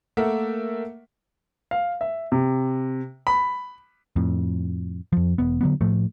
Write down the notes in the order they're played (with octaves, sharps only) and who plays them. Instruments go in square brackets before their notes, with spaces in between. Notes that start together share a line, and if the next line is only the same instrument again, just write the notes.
[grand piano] A3 A#3 A#4 E5 F#5
F5
E5
C3
B5
[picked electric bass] F2 A2
F2 F3
E1 B3
D3 F#3 B3
A2 F3 A3